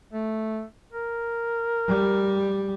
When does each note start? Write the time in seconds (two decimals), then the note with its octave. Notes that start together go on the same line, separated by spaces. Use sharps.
0.13 A3
0.92 A#4
1.88 G3